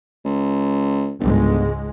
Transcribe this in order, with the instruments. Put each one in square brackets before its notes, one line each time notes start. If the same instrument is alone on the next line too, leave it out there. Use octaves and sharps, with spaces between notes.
[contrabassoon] C#2
[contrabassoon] G1 [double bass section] C#2 G#2 G#3